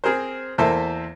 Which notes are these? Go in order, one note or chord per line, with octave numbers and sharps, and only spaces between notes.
C4 G#4 A#4 C5
E2 A#3 A4 C5 E5